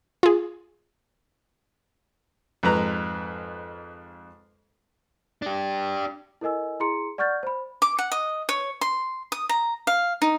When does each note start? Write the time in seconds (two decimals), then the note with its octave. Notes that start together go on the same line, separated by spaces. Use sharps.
0.23 F4 G#4
2.63 F2 G#2 B4 A#5
5.42 D4 G4
6.41 E4 A4 A#4 D#5 G#5 E6
6.80 E4 G#4 A#5 C6 C#7
7.18 D5 F#5 C#6 F6 G6 A6
7.43 C5 B5
7.82 D6
7.99 F#5
8.12 D#5
8.49 C#5
8.81 C6
9.32 D#6
9.49 A#5
9.87 F5
10.22 D#4